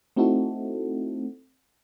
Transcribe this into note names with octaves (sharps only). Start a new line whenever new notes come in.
A3 C4 D#4 E4 F#4 A4